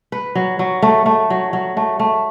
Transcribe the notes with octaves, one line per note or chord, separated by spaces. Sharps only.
B4
F#3
F#3
A3
A3
F#3
F#3
A3
A3